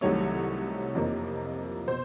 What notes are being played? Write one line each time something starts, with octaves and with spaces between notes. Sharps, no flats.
C2 C3 D#3 F#3 A3 C#5
F2 C3 F3 A#3 D#4
B2 C5